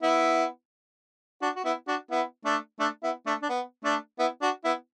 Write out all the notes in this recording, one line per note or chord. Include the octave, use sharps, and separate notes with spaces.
B3 E4
D4 F#4
F#4
B3 E4
D4 F#4
B3 E4
A3 D4
A3 D4
B3 E4
A3 D4
D4
B3
A3 D4
B3 E4
D4 F#4
B3 E4